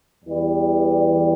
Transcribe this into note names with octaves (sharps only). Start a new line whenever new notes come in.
E2 E3 G3